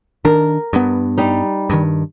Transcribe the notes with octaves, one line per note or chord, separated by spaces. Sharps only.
D#3 D4 A#4
G2 B3
G3 D#4
G2 D#3